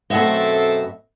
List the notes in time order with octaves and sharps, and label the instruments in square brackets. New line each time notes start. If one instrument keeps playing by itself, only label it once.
[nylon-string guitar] F#2 B2 A3 [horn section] C4 A4 [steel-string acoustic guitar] D#5 E5 F#5